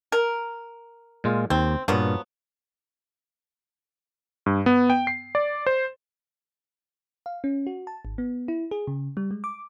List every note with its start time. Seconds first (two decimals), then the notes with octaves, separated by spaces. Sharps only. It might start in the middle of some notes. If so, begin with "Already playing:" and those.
0.12 A#4
1.24 A#2 G#3 F4
1.50 D#2 C4
1.88 G2 A#2 F3 F#3 B3
4.46 G2
4.66 B3
4.90 G5
5.07 C7
5.35 D5
5.67 C5
7.26 F5
7.44 C#4
7.67 F#4
7.87 A5
8.05 G#1
8.18 B3
8.48 E4
8.71 G#4
8.87 C#3
9.17 G3
9.31 G#3
9.44 D6